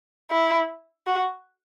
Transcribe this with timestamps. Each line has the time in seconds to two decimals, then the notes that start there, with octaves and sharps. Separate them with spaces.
0.31 E4
1.07 F#4